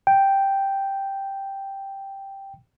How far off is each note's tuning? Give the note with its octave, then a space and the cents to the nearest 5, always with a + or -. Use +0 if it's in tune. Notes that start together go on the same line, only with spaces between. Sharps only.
G5 +0